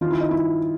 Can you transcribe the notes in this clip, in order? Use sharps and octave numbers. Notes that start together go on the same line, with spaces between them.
D#3 F4
E4
D#4
E4